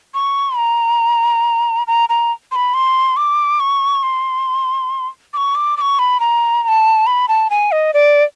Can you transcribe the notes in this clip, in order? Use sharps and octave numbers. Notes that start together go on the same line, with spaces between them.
C#6
A#5
A#5
A#5
C6
B5
C6
D6
C#6
C6
D6
C#6
D6
D6
C#6
B5
A#5
A#5
A5
B5
A5
G#5
D#5
D5